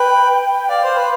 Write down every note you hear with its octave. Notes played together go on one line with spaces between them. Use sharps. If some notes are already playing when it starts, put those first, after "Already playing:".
Already playing: B4 G5
D5 F5
C5
B4